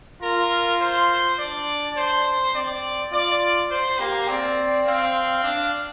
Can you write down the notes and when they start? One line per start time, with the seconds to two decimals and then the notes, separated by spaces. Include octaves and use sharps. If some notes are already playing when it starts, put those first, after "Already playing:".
0.22 F4 A#4
0.81 C5
1.38 D4 D5
1.97 C5
2.54 C4 D5
3.12 F4 D5
3.70 C5
3.99 A#3 G4
4.28 C4 D5
4.87 C4 F5
5.43 D4 F5